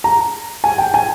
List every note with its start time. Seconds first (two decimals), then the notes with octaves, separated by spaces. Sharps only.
0.04 A#5
0.64 G#5
0.78 G5
0.94 G#5